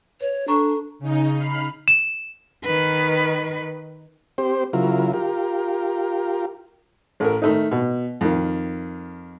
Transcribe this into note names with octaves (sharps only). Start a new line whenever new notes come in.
B4 C#5
D4 A4 A#5 C#6
C#3 D#4
B5 F6 C7
E7
D#3 B4
C4 G4 C5
C#3 F#3 E4 F4 A#4
F4 G4 A#4
A1 A4 A#4
D#3 A3 D#4
B2
F2 D#3